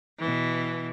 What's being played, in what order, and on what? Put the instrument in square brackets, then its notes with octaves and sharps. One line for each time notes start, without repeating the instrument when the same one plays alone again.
[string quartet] B2 E3